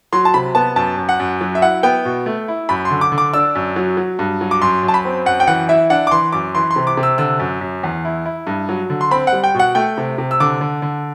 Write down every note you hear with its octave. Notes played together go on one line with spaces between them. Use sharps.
F#3 C6
A5
C3 B5
B3 A5
F#2 A5
F#2
F#5
F#2
F#3
E5
E4 F#5
B3 G5
B2
A3
E4
F#2 B5
C6
D3
D6
D3
D6
D4 E6
F#2
F#3
F#3
G2
F#3
D6
F#2 C6
F#2
A5
B5
C4
F#2 F#5
G5
E3 F#5
E4 E5
D4 F#5
D6
E3 C6
F#2 D6
E3 C6
C6
C3
D6
C3
E6
D3 E6
F#2
F#2
E2
E4
E4
G2
F#3
D3
C6
C4 B5
F#5
G3
G5
B2
F#5
A3 G5
C3
C3
E6
D3 D6
D3
D3